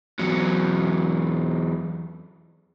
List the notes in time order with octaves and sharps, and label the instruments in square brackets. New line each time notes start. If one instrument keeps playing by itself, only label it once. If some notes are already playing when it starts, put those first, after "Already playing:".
[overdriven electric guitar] E2 F#3